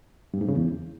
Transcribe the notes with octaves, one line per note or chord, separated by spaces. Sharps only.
G2
G#2
C#3
E2